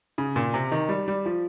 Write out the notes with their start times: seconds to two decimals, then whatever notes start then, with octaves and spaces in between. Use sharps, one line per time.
0.18 C#3
0.36 A#2
0.54 C3
0.71 D#3
0.89 G3
1.08 G3
1.26 F3